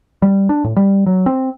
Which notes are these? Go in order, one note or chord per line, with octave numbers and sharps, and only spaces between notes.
G3
D4
A2
G3
F#3
C4